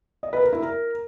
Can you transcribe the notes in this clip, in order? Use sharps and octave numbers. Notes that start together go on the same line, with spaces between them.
D#5
B4
A#4
E4
A#4